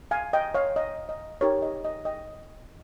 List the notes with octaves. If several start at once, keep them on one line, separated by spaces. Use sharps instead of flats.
F5 G#5
D#5 G5
C#5 F5
D#5
D#5
D#4 G4 A#4 C#5
D#5
D#5
D#5 G5